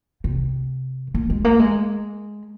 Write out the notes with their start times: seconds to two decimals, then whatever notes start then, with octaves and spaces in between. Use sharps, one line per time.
0.24 C3
1.14 A#3
1.30 G#3
1.45 A#3
1.59 G#3